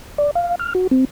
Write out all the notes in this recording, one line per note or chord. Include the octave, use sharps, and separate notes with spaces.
D5
F5
F6
F#4
C4